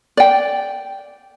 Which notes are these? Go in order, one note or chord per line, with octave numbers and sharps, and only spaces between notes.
D5 G5